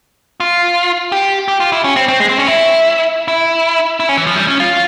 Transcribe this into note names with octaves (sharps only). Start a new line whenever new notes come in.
F4
G4
G4
F4
E4
C#4
C4
C4
G#3
C4
C#4
E4
E4
E4
C#4
E3
F3
G3
C#4
F4